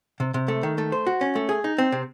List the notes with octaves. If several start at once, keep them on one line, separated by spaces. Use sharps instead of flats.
C3
C3
A3
D#3
A3
C5
F#4
C#4
A3
G#4
D#4
C4
C3